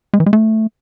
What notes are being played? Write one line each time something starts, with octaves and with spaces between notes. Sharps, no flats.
G#3
E3
G#3
A3